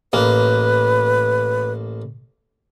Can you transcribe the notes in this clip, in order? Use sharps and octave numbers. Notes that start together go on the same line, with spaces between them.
A1 A#3 B4